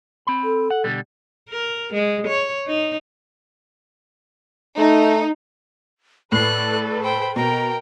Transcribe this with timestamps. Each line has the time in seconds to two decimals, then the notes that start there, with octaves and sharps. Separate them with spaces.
0.27 C4 B5
0.44 A4
0.71 F#5
0.84 B2 D3 G3
1.49 A#4
1.94 G#3
2.28 C#5
2.67 D#4
4.78 A3 D#4
6.32 A2 A4 B4 D5 F#6 C7
7.03 C5 G5 B5
7.36 B2 A#4 G5 A#5